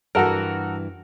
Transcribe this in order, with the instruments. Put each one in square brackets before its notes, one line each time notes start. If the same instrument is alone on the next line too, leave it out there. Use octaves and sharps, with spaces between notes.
[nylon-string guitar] G2 E3 [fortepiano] F#4 A4 A#4